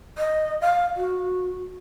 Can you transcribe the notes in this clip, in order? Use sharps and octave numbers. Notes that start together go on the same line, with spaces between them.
D#5
F5
F#4